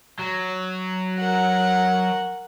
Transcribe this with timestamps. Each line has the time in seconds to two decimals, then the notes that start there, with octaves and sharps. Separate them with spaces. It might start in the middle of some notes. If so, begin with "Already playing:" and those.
0.19 F#3
1.19 A#4 F#5